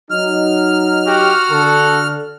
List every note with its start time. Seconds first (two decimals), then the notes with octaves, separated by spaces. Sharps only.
0.11 F#3 D#4 F6
1.07 F#4 G4
1.51 D3 A4